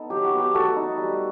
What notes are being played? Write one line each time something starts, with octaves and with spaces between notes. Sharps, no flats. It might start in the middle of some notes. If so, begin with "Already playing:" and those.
Already playing: B3 D#4 A4
F#3 G4
F#4
B3
G4
A3 F#4 A4
D#4
G3